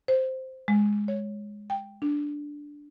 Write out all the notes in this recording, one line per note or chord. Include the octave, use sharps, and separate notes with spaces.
C5
G#3
C#5
G5
D4